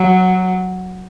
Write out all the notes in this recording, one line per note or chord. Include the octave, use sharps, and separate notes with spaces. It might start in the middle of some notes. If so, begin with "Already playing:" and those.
Already playing: F#3